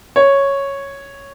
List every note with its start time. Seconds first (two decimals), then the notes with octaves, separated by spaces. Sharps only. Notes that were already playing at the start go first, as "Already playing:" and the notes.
0.16 C#5